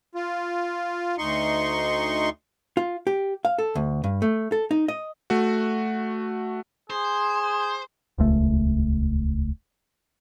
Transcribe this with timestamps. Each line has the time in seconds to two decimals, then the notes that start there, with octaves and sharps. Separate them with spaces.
0.15 F4
1.18 D2 D#4 C6 C#6
2.77 F4
3.07 G4
3.45 F5
3.58 A4
3.75 D2
4.04 G2
4.22 A3
4.52 A4
4.71 D#4
4.88 D#5
5.30 A3 F#4
6.90 G#4 C5
8.18 D#1 C#2 A3